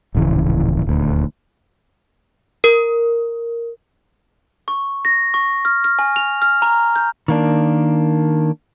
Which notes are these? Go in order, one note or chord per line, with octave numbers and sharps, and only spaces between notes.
D1 A#1 C#3 E3
D#1 D2
A#4
C#6
A#6
C#6
F6
F6
G#5
F7
F6
A#5
G6
D#3 A#3 D4